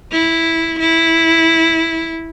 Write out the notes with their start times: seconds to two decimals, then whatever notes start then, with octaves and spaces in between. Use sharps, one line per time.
0.12 E4
0.80 E4